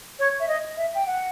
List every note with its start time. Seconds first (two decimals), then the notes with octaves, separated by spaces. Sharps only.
0.19 C#5
0.40 E5
0.48 D#5
0.77 E5
0.95 G5
1.06 F#5